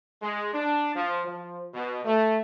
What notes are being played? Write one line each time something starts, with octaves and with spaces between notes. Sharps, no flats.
G#3
D4
F3
F3
B2
A3